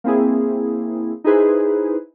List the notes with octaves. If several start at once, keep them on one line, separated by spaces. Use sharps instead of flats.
A#3 C4 E4 G#4
D#4 E4 G#4 B4 C5